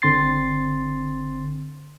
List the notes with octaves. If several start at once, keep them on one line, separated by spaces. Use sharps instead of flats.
G1 D3 C4 C6 A6 C7